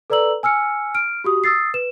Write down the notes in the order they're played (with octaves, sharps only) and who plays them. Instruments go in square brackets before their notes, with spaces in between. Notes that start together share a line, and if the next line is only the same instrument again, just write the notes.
[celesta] A4 B4 D5 A#5 E6 F#7
G#5 E6 F6 C#7
F6 D7
F#4 G4 D#6
D#6 E6 A6 C7
B4 E7